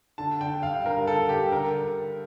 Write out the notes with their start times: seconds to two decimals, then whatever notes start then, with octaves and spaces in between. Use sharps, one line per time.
0.18 D3 A5
0.41 D3 G5
0.63 G2 F5
0.86 G2 A#4
1.08 D3 A4
1.29 G2 G4
1.51 D3 A#4